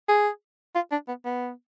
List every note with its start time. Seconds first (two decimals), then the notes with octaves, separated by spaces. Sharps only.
0.09 G#4
0.75 F4
0.92 D4
1.08 B3
1.25 B3